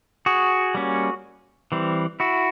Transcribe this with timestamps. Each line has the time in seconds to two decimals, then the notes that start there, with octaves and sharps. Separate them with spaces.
0.26 F#4 G#4
0.75 G3 A#3 C#4
1.72 E3 G3 C4
2.20 E4 F#4